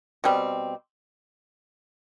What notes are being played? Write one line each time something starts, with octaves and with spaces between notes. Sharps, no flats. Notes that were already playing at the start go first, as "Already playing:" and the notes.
B2 G3 C4